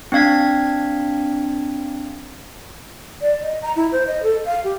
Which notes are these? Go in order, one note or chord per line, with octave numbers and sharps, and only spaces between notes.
C4 D4 F5 G#6 B6
D5
D#5
A#5
E4
C5
D#5
A4
F5
G4